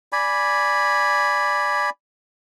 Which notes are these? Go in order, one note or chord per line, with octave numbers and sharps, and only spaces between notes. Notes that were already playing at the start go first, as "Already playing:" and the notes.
D5 G#5 B5